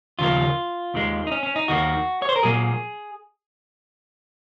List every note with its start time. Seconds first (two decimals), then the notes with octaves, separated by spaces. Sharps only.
0.19 D#2 C#3 F3 A#3 F4
0.94 D#2 D#3 G#3
1.27 D#4
1.32 C#4
1.43 C#4
1.56 D#4
1.68 D#2 D#3 A#3 F#4
2.22 C#5
2.29 C5
2.36 A#4
2.43 A#2 F#3 A#3 G#4